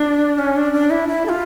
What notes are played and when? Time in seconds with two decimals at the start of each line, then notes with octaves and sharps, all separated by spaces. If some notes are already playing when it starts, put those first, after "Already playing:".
Already playing: D4
0.38 C#4
0.56 D4
0.73 D4
0.90 E4
1.08 E4
1.25 A4
1.29 F4